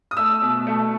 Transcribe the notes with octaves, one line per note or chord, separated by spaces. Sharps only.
D#6
A3 E6
B2
A3